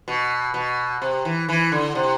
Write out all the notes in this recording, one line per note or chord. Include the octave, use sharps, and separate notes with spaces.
B2
B2
C3
E3
E3
D3
C3